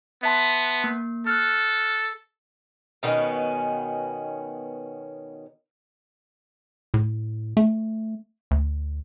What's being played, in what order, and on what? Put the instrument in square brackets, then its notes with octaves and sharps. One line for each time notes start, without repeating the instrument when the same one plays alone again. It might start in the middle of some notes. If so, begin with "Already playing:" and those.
[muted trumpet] B3 [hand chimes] E5 A5 C6
[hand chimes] A#3
[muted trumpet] A4 [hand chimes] F6 F#6
[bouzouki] B2 D#3 B3 C#4
[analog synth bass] A2
A3
D2